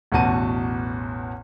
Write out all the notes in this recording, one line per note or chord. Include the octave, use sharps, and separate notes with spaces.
A1 E2 B2 F#4 A5 D#7